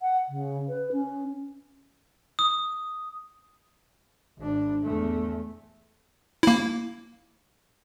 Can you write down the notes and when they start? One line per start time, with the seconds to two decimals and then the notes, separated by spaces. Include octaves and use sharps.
0.01 F#5
0.29 C#3
0.69 B4
0.92 C#4
2.39 D#6
4.38 G#1 D4
4.83 E2 A3
6.43 A#3 E4